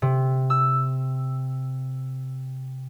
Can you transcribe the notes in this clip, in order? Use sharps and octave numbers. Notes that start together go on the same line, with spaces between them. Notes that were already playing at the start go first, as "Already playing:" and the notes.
C3
E6